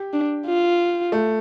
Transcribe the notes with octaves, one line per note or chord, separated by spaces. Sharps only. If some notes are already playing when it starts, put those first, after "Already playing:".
Already playing: G4
D4
F4
A3